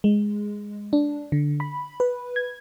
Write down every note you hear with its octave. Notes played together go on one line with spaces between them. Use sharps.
G#3
D4
D3
B5
B4
G#6